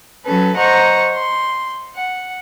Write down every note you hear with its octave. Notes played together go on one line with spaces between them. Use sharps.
F#3 C#4 A4 B4
C5 D#5 F#5 A#5 C#6
C6
F#5